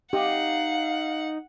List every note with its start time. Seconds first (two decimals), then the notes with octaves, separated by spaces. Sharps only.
0.13 D#4 G4 F5 F#5